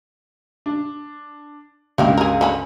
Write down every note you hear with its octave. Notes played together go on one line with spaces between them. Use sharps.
D4
C#2 G2 A3 A#3 G4
G#4 A#4
D3 C#4 B5